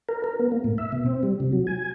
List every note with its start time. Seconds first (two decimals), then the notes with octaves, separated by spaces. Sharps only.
0.09 A#4
0.24 A#4
0.39 B3
0.52 A#3
0.64 A2
0.78 E5
0.92 B2
1.06 C4
1.23 G3
1.40 C3
1.53 F#3
1.67 G#5